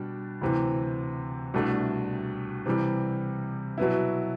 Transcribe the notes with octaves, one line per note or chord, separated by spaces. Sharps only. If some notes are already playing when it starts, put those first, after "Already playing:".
Already playing: B2 G3 D4
D2 C3 E3
C2 B2 A3 D4
C3 E3 G3
B2 F#3 B3 E4